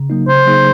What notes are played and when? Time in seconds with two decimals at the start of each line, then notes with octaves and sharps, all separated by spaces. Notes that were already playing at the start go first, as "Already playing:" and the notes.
Already playing: C#3
0.10 F#3 A#3 D#4
0.28 C#3 C5
0.46 F#3 A#3 D#4 G#4